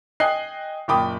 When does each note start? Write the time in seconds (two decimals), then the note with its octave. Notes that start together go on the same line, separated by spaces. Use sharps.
0.20 D#5 G5 G#5 D#6 F#6 C7
0.88 F#1 A#2 G5 B5 D6 D#6